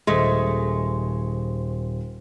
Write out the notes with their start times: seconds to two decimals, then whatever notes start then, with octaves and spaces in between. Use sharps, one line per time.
0.07 D#1 G#3 A3 C5